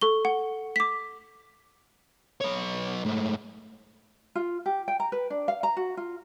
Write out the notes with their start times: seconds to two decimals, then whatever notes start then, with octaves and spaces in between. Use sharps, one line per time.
0.01 A4 C#6 G7
0.25 F#5
0.76 D6 B6
2.41 B1 C#5
3.05 G#2 A3
4.35 F4
4.66 G4
4.88 G5
5.00 A#5
5.12 B4
5.30 D4
5.48 F5
5.63 A#5
5.77 F#4
5.97 F4